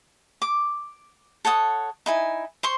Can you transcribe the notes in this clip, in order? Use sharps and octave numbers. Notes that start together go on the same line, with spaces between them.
D6
A4 C#5 F#5 D#6
D#4 E4 G#5
C5 C6 C#6